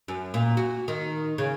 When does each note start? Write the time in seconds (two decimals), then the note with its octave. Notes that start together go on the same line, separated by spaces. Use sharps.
0.08 F#2
0.34 A#2
0.57 F#4
0.88 D#3
1.38 C#3